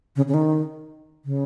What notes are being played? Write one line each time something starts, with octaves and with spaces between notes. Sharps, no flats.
C#3
C#3
D#3
C#3